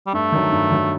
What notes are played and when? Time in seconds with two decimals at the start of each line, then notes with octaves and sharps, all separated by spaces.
0.07 G3
0.13 G2 A3
0.32 D#3 F#3
0.52 G2
0.71 D#3 F#3